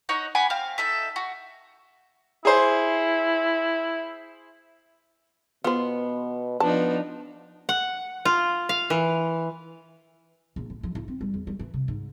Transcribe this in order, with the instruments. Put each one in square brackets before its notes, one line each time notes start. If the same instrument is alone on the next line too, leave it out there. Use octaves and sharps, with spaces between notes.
[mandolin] D#4 C#5 D#5 F#5
F#5 G#5 B5 D6
C4 F5
D#4 A4 E5
F#4
[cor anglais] E4 [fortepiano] G#4 C5
[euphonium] B2 [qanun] B3 [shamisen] F4 C5
[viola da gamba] F3 D4 D#4 [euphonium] B3 [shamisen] A5
[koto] F#5
F4
F5
E3
[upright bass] A#1
A2
F3
E4
C4
G3
E2
G3
E3
C3
G#2